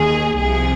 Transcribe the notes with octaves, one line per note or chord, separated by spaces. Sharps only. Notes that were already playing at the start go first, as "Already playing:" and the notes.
Already playing: D#2 D#3 G#4
C2 C3 F3 G#4